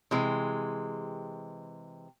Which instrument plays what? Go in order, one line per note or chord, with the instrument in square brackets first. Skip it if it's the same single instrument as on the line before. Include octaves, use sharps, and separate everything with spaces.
[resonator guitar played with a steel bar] C3 E3 G#3